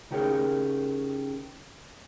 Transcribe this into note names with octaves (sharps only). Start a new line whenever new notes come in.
C#3 D#4 G4 G#4 A#4 C#5